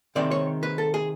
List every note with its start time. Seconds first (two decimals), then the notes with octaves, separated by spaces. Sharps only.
0.15 C3 D#3 G#3 C4 D5
0.31 C#5
0.63 B4
0.78 A4
0.94 G#4